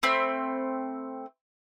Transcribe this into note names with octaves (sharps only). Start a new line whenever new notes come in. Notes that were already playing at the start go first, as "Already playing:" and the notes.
A3 C4 B5